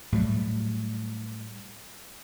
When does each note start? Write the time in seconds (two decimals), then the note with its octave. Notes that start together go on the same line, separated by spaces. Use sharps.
0.12 A2 F#3 G3